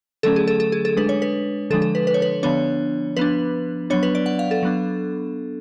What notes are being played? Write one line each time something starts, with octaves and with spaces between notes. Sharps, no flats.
D3 F#3 A3 C#4 A4
G#4
A4
A4
G#4
A4
G#3 D4 B4
C#5
B4
D3 F3 G#3 D4 A4
A4
B4
B4
C#5
B4
D3 F3 B3 D4 C#5
F3 B3 D4 B4
F#3 B3 D4 C#5
B4
D5
F#5
F5
A4
F#3 B3 D4